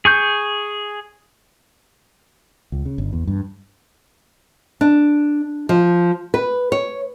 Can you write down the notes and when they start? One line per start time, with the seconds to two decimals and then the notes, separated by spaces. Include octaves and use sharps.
0.05 G#4 C#6 G6
2.72 C#2
2.86 C#3
2.98 G1
3.13 E2
3.27 G2
4.81 D4
5.69 F3
6.34 B4
6.72 C#5